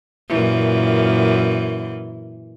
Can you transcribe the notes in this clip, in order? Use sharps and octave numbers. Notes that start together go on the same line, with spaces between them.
F#2 A#2 E3